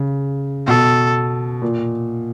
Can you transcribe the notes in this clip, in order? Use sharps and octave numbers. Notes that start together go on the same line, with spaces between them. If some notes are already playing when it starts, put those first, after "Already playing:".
Already playing: C#3
B2 A4
A#2